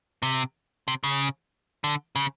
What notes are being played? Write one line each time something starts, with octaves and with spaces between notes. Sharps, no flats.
C3
C3
C#3
D3
C#3